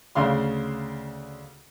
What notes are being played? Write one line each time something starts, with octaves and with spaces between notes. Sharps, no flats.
D2 C#3 F5 C6